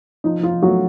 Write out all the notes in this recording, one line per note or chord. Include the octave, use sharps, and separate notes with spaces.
F3 D#4
F3 F4
F3
F#3 A3 F#4